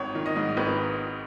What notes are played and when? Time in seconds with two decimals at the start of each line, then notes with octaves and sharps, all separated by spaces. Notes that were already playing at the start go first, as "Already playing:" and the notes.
Already playing: G#1 C#5
0.15 D#3
0.26 D#5
0.36 G#2
0.57 G#1 B4